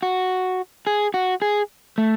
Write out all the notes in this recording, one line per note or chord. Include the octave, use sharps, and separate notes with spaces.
F#4
G#4
F#4
G#4
A3